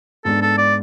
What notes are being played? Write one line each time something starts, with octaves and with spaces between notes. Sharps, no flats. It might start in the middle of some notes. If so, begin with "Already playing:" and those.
G#2 G#3 B3 D4 A4
A4
D5